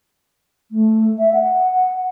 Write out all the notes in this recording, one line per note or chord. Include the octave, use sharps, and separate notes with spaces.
A3
E5
F#5